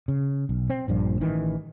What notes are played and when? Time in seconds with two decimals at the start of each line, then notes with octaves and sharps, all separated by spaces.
0.08 C#3
0.49 B1
0.70 C4
0.88 A#1 G2 A#2 F3
1.21 A1 D#3 E3